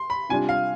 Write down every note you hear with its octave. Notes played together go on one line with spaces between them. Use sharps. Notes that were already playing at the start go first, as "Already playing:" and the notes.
Already playing: C6
B5
C3 G3 D4 F4 G#5
F5